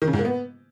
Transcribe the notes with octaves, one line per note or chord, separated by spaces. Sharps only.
D#3
C#3
G#2
A#3
B3